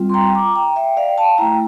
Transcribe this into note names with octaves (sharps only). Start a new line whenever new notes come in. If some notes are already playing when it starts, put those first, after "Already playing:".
Already playing: G3 C4 F4
C6
G5 A#5
A#5 D6
G5 A#5
E5 G5
D5 F5
G5
F5 A5
A3 E4 G5 A#5